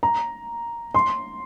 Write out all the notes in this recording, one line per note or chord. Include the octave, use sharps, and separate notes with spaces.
A#5
C6